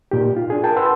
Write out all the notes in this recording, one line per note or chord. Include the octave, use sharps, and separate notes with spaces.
A#2 D#4 G4
F4
D4 G#4
A#4 G5 A5
B4 F#5 C6 E6